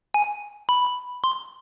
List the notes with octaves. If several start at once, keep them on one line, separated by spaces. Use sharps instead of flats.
G#5
B5
C6